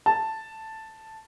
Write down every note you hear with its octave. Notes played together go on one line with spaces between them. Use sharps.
A5